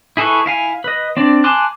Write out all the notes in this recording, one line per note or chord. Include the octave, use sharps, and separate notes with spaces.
E4 G#4 A4 B4 C#6
E4 F5 G#5
B4 D#5
C4 D4 D5
G#5 A5 C6 D6 F#6